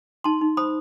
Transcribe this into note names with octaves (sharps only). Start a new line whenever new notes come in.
D#4 A5 C6
D#4
C5 B5 D#6